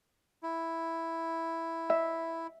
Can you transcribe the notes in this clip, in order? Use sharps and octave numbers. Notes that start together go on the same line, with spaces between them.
E4
E5